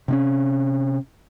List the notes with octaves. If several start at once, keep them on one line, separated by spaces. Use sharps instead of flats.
C3 C4 C#4